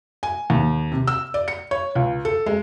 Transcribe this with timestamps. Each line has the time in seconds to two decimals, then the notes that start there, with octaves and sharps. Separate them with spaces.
0.23 G#5
0.50 D#2
0.92 C3
1.08 E6
1.34 D5
1.48 C#7
1.71 C#5
1.95 C#2
2.25 A4
2.46 G#3